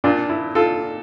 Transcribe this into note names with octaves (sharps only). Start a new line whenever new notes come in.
A#2 D4 F4
E4
F4 A4